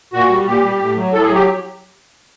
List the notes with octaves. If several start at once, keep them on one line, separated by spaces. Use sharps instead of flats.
A#2 F#4
G3
A#2 G4
G3
A2
F#3
A2 A4
G#4
F#3
G4